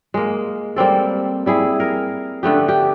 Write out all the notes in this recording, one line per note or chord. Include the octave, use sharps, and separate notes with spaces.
G#3 A#3
G3 A#3 C4 A4
G3 E4 G#4
A#4
D3 A3 B3 G4
G4